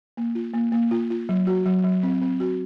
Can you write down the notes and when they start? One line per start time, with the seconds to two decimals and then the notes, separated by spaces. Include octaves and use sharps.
0.17 A#3
0.35 F4
0.53 A#3
0.72 A#3
0.91 F4
1.10 F4
1.29 F#3
1.47 F#4
1.66 F#3
1.84 F#3
2.03 C4
2.21 C4
2.40 F#4